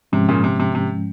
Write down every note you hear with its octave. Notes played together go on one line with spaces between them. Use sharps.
G#2 C3 F3 G#3 C#4
A#2 C#3
C3
C3
C3